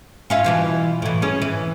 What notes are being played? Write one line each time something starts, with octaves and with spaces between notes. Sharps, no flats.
C#4 F4 E5
B2 E3 F4
A2 E3
C#4 G#4
E3